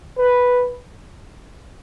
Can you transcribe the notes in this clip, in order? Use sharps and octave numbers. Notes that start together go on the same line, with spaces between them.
B4